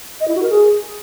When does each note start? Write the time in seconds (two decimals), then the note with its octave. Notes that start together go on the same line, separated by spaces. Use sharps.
0.21 D#5
0.28 E4
0.35 F#4
0.42 A#4
0.50 G#4